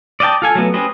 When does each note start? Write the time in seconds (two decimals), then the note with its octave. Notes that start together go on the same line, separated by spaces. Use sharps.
0.20 D5 D#5 F5 G5 A5
0.42 F4 A4 G#5
0.55 F#3 A3 B3
0.74 C#4 G4 B4 C5 D#5